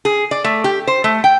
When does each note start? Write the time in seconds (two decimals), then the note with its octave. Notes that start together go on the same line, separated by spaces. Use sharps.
0.05 G#4
0.31 D5
0.44 A3
0.64 G4
0.87 C5
1.04 A3
1.24 G5